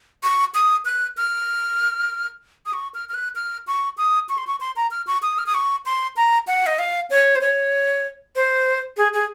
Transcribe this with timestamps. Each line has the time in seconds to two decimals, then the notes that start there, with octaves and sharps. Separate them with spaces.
0.23 C#6
0.55 D#6
0.85 F#6
1.17 F6
2.66 D#6
2.73 C#6
2.95 F6
3.09 F6
3.14 F#6
3.36 F6
3.67 C#6
3.98 D#6
4.29 C#6
4.38 C6
4.47 C#6
4.60 C6
4.76 A#5
4.91 F6
5.07 C#6
5.23 D#6
5.38 F6
5.46 D#6
5.54 C#6
5.86 C6
6.17 A#5
6.47 F#5
6.67 D#5
6.79 F5
7.10 C#5
7.36 C5
7.41 C#5
8.36 C5
8.97 G#4
9.14 G#4